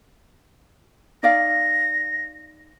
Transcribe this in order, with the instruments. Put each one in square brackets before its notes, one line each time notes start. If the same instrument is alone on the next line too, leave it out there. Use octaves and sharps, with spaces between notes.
[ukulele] D#4 D5 F5 [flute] A#6